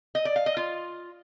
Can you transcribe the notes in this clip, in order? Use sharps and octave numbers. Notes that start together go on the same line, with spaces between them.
D#5
D5
F5
D#5
F4